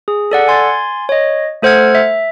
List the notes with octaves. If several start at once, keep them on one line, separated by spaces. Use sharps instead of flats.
G#4
A4 D5 F#5
G#5 C6 G#6 A6
C#5 D#5
A3 A4 C5 F#5 F6 G#6
E5